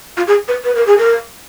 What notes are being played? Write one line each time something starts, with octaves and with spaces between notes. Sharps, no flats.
F4
G#4
B4
B4
A#4
G#4
A#4